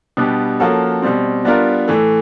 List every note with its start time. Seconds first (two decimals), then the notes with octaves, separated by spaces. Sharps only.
0.17 B2 G3 B3 D4 G4
0.60 F3 A#3 C#4 F#4 A4
1.02 B2 G3 C4
1.45 G3 B3 D4 F4 A#4
1.88 A2 E3 A3